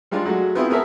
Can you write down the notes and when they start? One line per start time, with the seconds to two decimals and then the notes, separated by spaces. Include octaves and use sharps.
0.11 G3 G#3 D4 F4
0.25 F#3 G#3 A3 F#4
0.55 B3 C4 E4 F4 G#4
0.70 B3 G#4 A#4 C#5 E5 A5